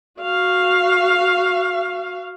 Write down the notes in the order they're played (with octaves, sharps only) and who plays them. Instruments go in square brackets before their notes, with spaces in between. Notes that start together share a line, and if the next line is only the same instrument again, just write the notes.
[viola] F#4 F5